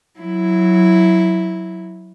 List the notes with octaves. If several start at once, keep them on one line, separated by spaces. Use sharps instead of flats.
F#3 E4